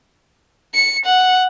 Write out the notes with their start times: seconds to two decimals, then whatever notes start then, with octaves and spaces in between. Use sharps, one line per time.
0.74 C#7
1.05 F#5